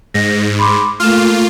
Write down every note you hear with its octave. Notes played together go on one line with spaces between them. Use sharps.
G#2 A#6
B5 C6 D6
A3 A#3 F4 F6 E7